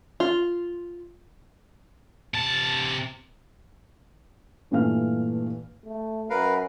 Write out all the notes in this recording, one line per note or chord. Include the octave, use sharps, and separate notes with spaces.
F4
C3 A5
G2 A#2 E3 A3 F5 F6
A3
F#2 A#4 B4 F5